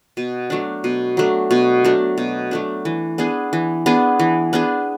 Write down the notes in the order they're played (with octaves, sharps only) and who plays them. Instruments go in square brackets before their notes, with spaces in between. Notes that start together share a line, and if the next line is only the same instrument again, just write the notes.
[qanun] B2
F#3 A3 D4
B2
F#3 A3 D4
B2
F#3 A3 D4
B2
F#3 A3 D4
E3
B3 D4 G#4
E3
B3 D4 G#4
E3
B3 D4 G#4